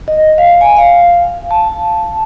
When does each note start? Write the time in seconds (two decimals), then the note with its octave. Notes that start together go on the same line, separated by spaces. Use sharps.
0.08 D#5
0.38 F5
0.61 G#5
0.76 F5
1.51 A5